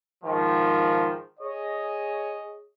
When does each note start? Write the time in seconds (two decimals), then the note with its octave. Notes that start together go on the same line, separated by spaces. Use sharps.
0.24 G#2 D#3 F3
1.40 G#4 C#5 D#5